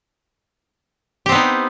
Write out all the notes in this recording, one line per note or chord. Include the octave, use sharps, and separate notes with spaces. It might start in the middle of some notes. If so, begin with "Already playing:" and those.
B3 C4 D#4 G4